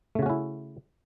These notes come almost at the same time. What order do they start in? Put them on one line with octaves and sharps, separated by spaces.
A3 C#3 F#4 C#4 E4